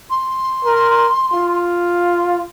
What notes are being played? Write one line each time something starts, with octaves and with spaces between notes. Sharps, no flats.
C6
A#4
F4